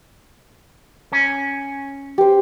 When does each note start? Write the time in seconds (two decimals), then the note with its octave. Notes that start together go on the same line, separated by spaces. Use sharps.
1.12 C#4
2.18 G4 C5